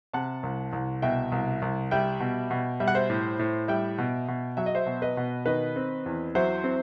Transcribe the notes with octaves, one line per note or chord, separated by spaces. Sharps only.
C3 F#5 A5
C2
C2
B2 E5 G5
C2
C2
G3 E5 G5
B2
B2
G3 E5
F#5
C5 E5
A2
A2
G3 E5 G5
B2
B2
F#3 E5
D#5
C5 E5
B2
B4 D#5
B2
D#3 B4 D#5
C4
E2
F#3 C5 E5
C4